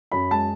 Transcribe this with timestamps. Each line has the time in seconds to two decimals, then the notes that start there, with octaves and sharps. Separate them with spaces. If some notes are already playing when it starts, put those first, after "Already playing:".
0.12 F#2 B5
0.30 G#3 A5